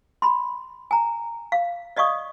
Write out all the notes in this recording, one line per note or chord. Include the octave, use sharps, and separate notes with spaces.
B5 C6
G#5 A#5
F5
D5 D#5 F5 C#6 D#6